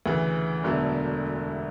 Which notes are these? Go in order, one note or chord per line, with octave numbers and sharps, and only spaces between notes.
D2 C#3 E3
E1 E2 D3 F#3 A3